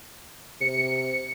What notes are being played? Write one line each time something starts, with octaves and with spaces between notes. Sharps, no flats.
C3 C#7